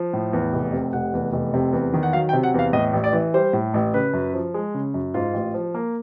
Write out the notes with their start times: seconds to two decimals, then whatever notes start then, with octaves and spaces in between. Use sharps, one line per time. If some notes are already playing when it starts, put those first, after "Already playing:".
Already playing: F3
0.13 A2
0.33 E2
0.53 F1
0.72 C3
0.93 F1 F#5
1.14 E2
1.33 F1
1.54 C3
1.73 E2
1.93 D#3
2.03 F#5
2.13 F#3 F5
2.29 G5
2.33 C3
2.43 F#5
2.54 E2 F5
2.73 A2 D#5
2.93 A1
3.04 D5
3.13 E3
3.34 G3 C5
3.53 A2
3.74 A1
3.94 C#3 B4
4.13 F#2
4.34 F3
4.54 G#3
4.74 C#3
4.94 F#2
5.14 G#2 F4
5.34 A1
5.54 F3
5.74 A#3